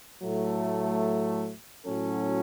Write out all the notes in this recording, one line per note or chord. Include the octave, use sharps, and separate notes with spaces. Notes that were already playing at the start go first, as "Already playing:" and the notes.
A2 F#3 A3
A2 F#3 C#4 F#4 A4